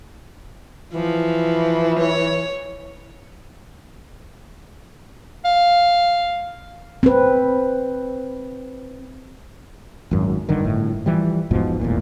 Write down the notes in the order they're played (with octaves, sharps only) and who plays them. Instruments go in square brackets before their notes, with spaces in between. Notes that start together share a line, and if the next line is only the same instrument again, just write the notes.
[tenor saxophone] E3 [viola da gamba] F3
[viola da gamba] C#5
[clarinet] F5
[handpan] C4 B4
[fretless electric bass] G#1 F#2
G2 D3 D#3
G1 A2
E3 F3 G3
E1 G#2 B2 F3
D#1 A1 E2 A#2